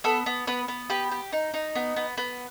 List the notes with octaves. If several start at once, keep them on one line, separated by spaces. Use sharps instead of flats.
B3 A4
B3
B3 B4
B3
G4 B4
G4
D#4
D#4
B3
B3
B3